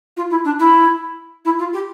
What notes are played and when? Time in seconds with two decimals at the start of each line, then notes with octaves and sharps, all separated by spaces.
0.17 F4
0.30 E4
0.44 D4
0.59 E4
1.45 E4
1.59 F4
1.73 G4